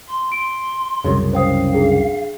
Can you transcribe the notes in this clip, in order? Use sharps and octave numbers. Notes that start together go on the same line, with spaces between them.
C6
C6 D7
C2 F#2 C#3
C5 F5 G5 D#6
D4 G#4 G5